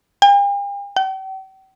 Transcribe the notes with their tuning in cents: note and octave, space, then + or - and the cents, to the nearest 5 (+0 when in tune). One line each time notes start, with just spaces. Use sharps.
G5 +45
G5 -45